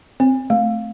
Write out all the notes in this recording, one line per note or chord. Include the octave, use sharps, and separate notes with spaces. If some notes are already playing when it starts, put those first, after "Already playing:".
C4
A3